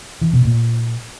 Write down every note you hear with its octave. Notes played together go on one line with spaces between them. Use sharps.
E3
B2
A#2